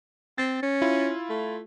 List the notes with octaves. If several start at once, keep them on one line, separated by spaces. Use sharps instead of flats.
C4 A6
C#4
E4 F4
A3